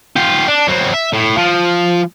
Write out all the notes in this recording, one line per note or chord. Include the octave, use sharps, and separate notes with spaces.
F4 G4
D4
F#3 C4
E5
A2
F3